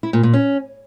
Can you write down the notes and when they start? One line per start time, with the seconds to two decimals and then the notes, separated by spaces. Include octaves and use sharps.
0.03 E4
0.13 A#2
0.23 A#2
0.33 C#4